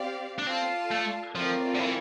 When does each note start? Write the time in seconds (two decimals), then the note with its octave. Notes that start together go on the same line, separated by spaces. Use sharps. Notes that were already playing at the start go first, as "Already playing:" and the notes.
Already playing: C4 G4 D5 F5
0.39 D4
0.47 C4 F4 A4 D5 F5 A5
0.91 A3
1.35 F3 A3 C4 F4 A#4 D5
1.75 D3
1.80 E3